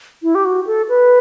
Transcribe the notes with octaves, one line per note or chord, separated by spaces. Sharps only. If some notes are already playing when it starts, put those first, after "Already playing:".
E4
G4
F#4
A4
B4